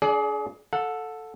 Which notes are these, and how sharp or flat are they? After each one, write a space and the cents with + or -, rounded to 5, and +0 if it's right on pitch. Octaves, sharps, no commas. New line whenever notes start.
D4 -35 G#4 +30 D5 +0
A4 +0 F#5 -35